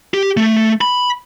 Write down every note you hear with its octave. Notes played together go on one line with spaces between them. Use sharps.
G4
A3
B5